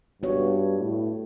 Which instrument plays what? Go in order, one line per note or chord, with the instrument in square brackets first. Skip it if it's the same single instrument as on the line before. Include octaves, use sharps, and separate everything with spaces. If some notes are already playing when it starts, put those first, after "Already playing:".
[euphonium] G2 [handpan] B3 F#4 C#5
[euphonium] A2